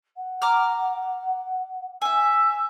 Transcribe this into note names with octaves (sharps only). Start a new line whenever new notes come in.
F#5
A#5 D6 F6
E5 G#5 E6